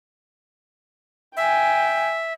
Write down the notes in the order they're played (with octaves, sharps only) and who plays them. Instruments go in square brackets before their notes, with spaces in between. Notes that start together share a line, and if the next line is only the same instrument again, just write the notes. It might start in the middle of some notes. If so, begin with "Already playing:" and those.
[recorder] E5 [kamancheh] G5 G#5